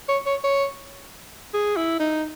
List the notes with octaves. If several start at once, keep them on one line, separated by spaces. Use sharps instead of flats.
C#5
C#5
C#5
G#4
E4
D#4